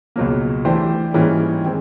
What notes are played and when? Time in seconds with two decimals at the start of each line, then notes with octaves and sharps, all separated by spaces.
0.16 C#2 B2 F#3 A#3
0.65 E3 A3 D4 G4 C5
1.14 G#2 E3 G3 A#3 C#4
1.63 D#3 G#3 C4